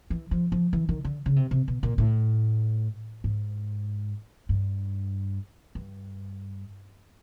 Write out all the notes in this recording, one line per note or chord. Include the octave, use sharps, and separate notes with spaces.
E3
F3
F3
E3
D#3
D3
C#3
C3
C3
B2
A#2
A2
G#2
G2
G2